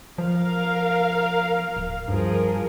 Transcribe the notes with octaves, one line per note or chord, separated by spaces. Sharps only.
F3 A#4 F5
D1
G2 F3 G#4 A#4